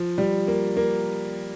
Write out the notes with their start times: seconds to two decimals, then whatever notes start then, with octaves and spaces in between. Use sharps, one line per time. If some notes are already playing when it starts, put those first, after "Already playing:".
Already playing: F3
0.18 G3
0.48 A#3
0.77 A#3